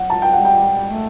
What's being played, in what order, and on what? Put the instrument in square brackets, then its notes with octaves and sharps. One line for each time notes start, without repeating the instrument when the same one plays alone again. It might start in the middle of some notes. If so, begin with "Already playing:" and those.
Already playing: [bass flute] F#3 [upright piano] F#5
[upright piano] A5
G5
[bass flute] G3 [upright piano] F#5
[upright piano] G5
[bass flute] A3